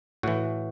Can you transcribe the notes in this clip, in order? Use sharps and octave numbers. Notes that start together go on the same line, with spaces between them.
A2 E3 F#4